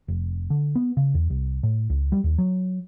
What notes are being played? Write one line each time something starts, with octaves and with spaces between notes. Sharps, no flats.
F1
D3
B3
C#3
E2
C2
A2
C#2
G3
D#2
F#3